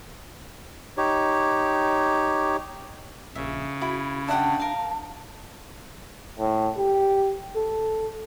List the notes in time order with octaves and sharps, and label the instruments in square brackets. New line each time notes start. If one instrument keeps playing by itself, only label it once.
[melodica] D#4 G4 C#5
[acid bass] A#1 [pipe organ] C#3 [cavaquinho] E5
[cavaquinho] E4 B5 [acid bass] F#4
[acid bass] D4 [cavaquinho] E5 F#5 G5 [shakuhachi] A5
[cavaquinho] A#4 F5
[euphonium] A2
G4
A4